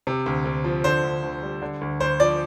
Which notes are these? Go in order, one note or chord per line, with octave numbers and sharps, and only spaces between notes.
C3
D2
D2
F3
D3 C5
D2
D2
G3
D3
D2
D2 C5
F3 D5